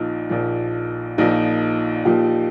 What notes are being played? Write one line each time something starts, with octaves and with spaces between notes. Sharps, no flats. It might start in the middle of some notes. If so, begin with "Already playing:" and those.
Already playing: A#1 A#2 F3 D#4
A#1 A#2 F3
A#1 A#2 F3 D#4
A#1 A#2 F3 G4